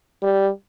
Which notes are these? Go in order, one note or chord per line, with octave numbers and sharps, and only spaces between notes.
G3